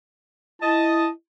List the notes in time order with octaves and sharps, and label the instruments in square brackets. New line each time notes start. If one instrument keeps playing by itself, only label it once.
[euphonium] E4 [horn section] D#5 A5